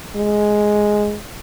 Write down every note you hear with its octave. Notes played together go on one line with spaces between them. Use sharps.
G#3